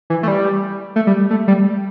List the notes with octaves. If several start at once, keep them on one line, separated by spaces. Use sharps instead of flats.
E3
A3
G3
A3
G3
A3
G3